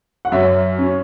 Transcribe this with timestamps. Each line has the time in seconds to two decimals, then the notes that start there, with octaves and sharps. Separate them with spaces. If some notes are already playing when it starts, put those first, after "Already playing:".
0.25 F#5
0.32 F#2 C#5 E5
0.79 C#4